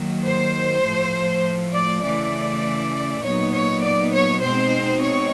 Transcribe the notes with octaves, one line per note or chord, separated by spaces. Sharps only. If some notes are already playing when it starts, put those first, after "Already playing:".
Already playing: D#3 F#3 A#3
C5
A2 F3 A3
D5
C#3 E3 A3 D5
A#2 F#3 B3 D#4 C#5
C#5
D5
C#5
B2 G#3 C4 D#4 C5
C#5